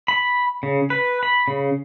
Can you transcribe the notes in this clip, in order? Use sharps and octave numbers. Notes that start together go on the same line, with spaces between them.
B5
C#3
B4
B5
C#3